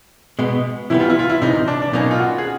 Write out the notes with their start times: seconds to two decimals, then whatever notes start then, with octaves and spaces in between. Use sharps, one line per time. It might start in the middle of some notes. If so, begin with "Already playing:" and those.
0.39 B2 G#3 B3
0.90 C3 E3 G3 B3 E4
1.00 F4
1.10 E4
1.19 F4
1.29 E4
1.42 C#2 C3 E3 D#4
1.68 D4
1.82 D4
1.93 B2 F#3 A#3 C#4 D#4
2.11 F4
2.19 F#4
2.38 G#4